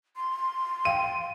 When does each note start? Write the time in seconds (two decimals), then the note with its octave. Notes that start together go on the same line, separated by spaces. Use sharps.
0.16 C6
0.85 F5 G5 D#7